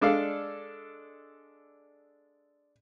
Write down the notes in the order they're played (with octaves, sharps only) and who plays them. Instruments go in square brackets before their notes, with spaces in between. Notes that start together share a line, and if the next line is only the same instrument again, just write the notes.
[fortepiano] G#3 D4 A4 D5 F5